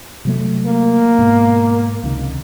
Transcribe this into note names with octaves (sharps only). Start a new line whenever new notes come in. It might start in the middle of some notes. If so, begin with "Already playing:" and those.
C3 F#3 A3
A#3
G#2 B2
C#2 C3 D#3